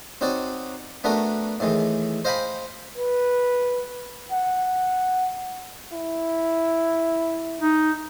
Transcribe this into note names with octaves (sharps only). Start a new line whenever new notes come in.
C4 D#4 F#4 C#5 D5
A3 B3 D4 F#4 A#4
A2 D#3 E3 G#3
C5 D#5 F5 G5 G#5 B5
B4
F#5
E4
D#4